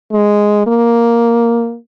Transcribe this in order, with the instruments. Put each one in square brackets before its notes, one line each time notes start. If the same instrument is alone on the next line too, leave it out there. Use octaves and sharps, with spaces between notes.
[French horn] G#3
A#3